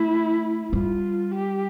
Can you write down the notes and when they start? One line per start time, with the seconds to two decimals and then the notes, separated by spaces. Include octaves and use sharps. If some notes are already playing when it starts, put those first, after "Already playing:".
Already playing: A3 E4
0.72 G3 F4
1.31 G4